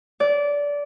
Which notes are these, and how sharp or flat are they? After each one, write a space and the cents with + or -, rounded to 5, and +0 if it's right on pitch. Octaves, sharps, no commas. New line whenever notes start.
D5 -20